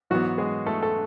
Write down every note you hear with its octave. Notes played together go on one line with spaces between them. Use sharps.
G#2 E3 F#3 B3 F#4
G#3 G#4
A3 A4
A4